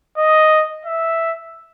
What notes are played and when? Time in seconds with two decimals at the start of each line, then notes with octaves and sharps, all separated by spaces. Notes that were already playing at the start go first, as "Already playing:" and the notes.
0.18 D#5
0.85 E5